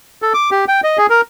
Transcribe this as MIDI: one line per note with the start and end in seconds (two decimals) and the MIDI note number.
0.22 0.33 69
0.34 0.50 86
0.51 0.65 67
0.68 0.81 79
0.84 0.98 75
0.98 1.07 68
1.10 1.21 70